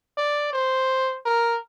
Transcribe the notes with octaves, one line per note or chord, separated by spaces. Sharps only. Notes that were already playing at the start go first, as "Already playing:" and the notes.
D5
C5
A#4